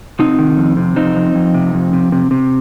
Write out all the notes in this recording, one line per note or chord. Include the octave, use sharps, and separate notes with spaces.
C3 C4 D#4
D#3
F2
C3
F2 C4 D#4
F2
F2
C3
F2
C3
C3
C3